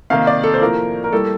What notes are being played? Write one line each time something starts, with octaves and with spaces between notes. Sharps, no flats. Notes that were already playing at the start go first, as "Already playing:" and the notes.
C3 D#3 A#3 F5
D5
A4
C5
A2 F3 A#3 A#4
A#4
A2 G3 A#3 A4